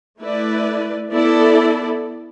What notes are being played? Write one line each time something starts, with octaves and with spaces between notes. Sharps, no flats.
A3 E4 B4 D5
B3 E4 A4 D5